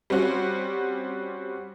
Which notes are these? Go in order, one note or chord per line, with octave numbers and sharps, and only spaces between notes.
G3 C4 C#4 F#4